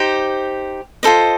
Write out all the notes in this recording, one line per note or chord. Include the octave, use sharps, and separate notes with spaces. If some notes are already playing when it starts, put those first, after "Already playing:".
Already playing: D#4 G4 C5
F4 A4 C5 D#5